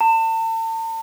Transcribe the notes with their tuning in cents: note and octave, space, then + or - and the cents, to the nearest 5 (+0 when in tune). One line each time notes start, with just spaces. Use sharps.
A5 +40